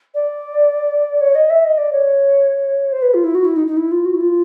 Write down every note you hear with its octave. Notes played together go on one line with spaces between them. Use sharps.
D5
C#5
D#5
E5
D#5
D5
C#5
C5
B4
F4
E4
F#4
E4
D#4
D#4
E4
F4
F#4
E4
F4